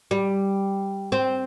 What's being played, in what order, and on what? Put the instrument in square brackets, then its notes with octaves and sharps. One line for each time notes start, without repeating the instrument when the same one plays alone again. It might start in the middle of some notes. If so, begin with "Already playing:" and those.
[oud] G3
C4